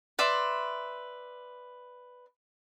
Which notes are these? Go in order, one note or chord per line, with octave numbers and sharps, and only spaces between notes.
B4 D5 E5 C6